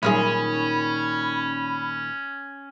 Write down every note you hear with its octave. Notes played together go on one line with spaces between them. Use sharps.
A#2 D#3 F#3 G3 C#4 G#4 B5